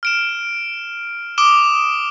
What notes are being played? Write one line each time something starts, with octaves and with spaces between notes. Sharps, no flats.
F6 D7 E7
D6 D#6 D7 E7 G7